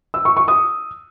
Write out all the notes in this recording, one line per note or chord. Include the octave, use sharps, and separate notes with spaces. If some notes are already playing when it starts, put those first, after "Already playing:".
E6
C#6
C#6
D#6